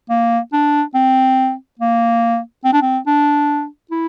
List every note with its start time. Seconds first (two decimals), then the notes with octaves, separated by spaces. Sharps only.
0.10 A#3
0.53 D4
0.95 C4
1.80 A#3
2.64 C4
2.73 D4
2.82 C4
3.07 D4
3.91 E4